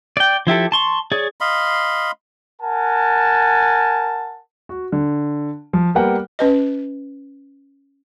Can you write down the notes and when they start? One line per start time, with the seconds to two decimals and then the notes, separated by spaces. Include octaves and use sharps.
0.17 D5 G5
0.47 F3 E4 G4 A4
0.72 A5 C6 C#6
1.12 G#4 C#5 D5
1.41 D#5 F5 B5 C6
2.61 A#4 F#5 G#5 A5
4.69 F#4
4.92 D3
5.73 F3
5.95 G3 A#3 B3 A#4 F#5 G5
6.39 C#4 B4 D#5